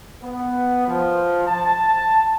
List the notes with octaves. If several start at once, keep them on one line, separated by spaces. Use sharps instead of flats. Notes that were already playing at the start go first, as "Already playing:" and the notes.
B3
F3
A5